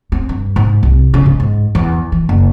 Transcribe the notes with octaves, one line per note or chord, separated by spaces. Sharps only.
C4
G2
G#2
C2
C#3
G#2
G#2
E2
E3
F#1